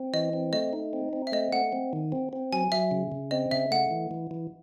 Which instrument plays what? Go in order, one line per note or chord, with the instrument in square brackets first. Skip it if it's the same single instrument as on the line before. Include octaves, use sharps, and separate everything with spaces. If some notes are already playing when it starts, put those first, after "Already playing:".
Already playing: [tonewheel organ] C4
[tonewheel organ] E3 [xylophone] D#5
[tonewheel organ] C4
[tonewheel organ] A3 [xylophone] D#5
[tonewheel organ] D#4
C4
C4
[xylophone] E5
[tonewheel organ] A3 [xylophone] D#5
[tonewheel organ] A3 [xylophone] F#5
[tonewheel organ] C4
D#3
C4
C4
[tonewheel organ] F#3 [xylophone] G#5
[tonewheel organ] F#3 [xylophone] E5
[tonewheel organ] C#3
C#3
[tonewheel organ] C4 [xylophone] D#5
[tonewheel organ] C#3 [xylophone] E5
[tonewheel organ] A3 [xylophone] F#5
[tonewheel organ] E3
E3
E3